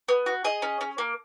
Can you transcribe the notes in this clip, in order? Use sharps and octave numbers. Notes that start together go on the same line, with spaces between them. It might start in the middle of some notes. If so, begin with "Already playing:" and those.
B3
F#4
G#4 D#5
C#4
C#4
A#3